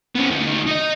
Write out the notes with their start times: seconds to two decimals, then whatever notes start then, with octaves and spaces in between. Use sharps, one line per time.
0.16 B3 C#4
0.30 D2 D#3
0.67 D#4 D#5